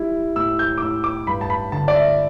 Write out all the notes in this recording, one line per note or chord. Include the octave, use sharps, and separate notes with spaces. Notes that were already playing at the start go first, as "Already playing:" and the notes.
Already playing: G3 E4
A2 E6
G6
D6
A2 E6
D6
G2 B5
A5
B5
D3 A5
D5
E5